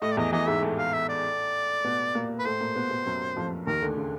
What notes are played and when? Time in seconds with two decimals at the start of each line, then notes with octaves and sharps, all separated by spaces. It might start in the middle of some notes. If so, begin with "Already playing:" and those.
0.02 A2 A3 D#5
0.12 D5
0.17 E2 E3 D#5
0.32 E2 E3 D#5
0.47 G#2 G#3 E5
0.63 A2 A3
0.78 F5
0.93 E5
1.09 D5
1.85 B2 B3
2.15 A#2 A#3
2.39 B4
2.45 A2 A3 C5
2.61 A#2 A#3
2.76 B2 B3
2.91 B2 B3
3.06 F#2 F#3
3.36 F2 F3
3.67 D#2 D#3 A#4
3.82 D2 D3
3.97 C#3